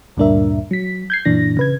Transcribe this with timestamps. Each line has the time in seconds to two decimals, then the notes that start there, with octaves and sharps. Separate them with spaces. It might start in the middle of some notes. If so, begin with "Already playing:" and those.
0.17 D2 G2 A#2 D4 A#4 E5
0.71 F#3 B6
1.10 G6 G#6 C7
1.25 F#2 A#2 E3 D4 A#6
1.57 C#3 B4 G#6